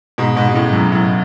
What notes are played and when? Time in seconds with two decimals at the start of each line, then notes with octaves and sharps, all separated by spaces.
0.18 G#2 B2
0.36 G#2 B2
0.49 B2
0.54 A2 C#3
0.73 F#2 A2
0.91 F#2 A2